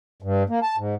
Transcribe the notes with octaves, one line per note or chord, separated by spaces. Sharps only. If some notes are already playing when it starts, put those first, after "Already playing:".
G2
A#3
A5
G#2